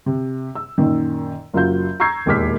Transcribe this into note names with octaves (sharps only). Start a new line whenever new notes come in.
C3
E6
F#2 A#2 D#3
F#1 F#3 F4 G6
A#5 C#6 E6 G6 G#6 C7
E1 D#2 A#2 D6 F6 B6